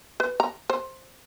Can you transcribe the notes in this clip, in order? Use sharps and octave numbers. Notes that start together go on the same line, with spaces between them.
B4
A#5
C5